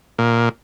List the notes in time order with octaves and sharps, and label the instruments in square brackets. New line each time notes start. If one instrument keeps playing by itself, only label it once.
[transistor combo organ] A#2